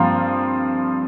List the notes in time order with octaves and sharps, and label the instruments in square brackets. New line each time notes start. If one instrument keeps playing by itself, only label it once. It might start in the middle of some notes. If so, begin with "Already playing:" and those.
Already playing: [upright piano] G2 F3 C4 [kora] A#3